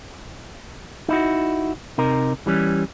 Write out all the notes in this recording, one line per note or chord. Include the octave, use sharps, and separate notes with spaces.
D#4 E4 F#4
C3 D#4 A#4
E3 G3 C#4